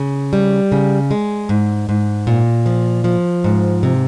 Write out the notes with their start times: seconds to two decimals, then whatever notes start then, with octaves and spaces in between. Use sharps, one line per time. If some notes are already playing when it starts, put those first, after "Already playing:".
Already playing: C#3
0.33 G3
0.72 C#3
1.11 G#3
1.49 G#2
1.89 G#2
2.27 A#2
2.66 F3
3.04 F3
3.44 G#2
3.83 C3